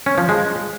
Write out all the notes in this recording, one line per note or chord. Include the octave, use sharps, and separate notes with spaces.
C#4
F3
G#3